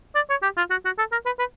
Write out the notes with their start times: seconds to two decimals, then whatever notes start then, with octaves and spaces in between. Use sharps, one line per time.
0.16 D5
0.30 C#5
0.43 G4
0.57 F4
0.71 F#4
0.85 F#4
0.98 A4
1.12 A#4
1.26 B4
1.39 B4